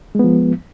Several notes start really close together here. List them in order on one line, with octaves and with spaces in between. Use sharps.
G#3 B3 F3